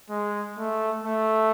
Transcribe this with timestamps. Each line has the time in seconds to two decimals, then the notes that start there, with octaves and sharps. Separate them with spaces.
0.10 G#3
0.58 A3
1.04 A3